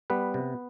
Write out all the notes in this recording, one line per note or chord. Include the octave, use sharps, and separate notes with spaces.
G3 B3 B4
C3